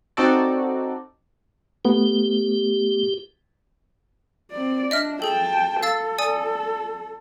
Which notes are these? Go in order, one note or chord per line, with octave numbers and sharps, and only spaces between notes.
C4 D#4 F#4 A4 D5
A3 B3 G4
C4 D5
D4 D#5 E5 F6
G#4 A4 G5 A5
A4 F5 E6 A6
D5 G#5 D#6